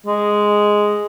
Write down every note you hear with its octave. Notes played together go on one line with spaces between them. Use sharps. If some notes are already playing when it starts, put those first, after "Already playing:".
G#3